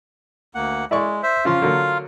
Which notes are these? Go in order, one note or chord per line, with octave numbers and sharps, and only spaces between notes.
D2 A#3 F#5
G#3 E4 D5 C#6
C5 E5
C#3 F3 F4 F5 C6
D3 F#3 A#3